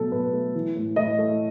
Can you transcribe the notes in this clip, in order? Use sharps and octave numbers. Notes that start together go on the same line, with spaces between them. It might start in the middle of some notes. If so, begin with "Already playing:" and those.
Already playing: B2 F#3 A3 A4
B2 B4
A3
E3
A2
A2 D#5
A3